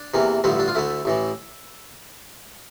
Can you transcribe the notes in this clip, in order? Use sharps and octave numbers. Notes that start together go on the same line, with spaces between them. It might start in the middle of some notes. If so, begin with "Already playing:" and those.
Already playing: D4
E2 C3 E3 A#3
A1 G2 D3 F3 A3 E4
D4
F4
D2 D3 A3 E4
A1 A2 E3